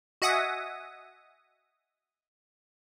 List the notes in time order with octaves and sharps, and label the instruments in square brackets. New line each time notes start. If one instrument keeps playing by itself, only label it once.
[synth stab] F#4 D#5 E5 F#5 G#5 D#6